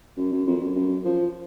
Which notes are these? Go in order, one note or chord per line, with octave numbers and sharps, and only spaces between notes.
F#2
F#2
F2
F#2
F#2
F3